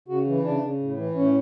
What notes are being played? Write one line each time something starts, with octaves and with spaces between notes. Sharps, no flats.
C#3 F#4
E3
C#3 D4
C#3
A2
E3
A2 C#4